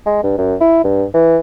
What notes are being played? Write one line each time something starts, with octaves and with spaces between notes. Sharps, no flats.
G#3
G2
F#2
E4
G2
E3